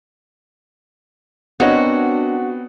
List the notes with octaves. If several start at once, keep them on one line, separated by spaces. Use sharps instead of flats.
B3 C4 D4 F#4 A#4 C#5 D#5